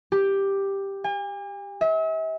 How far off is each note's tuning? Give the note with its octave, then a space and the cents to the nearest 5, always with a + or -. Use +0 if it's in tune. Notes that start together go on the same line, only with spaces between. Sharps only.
G4 +5
G#5 -45
E5 -40